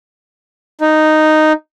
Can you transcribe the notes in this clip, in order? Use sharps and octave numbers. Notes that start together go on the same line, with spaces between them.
D#4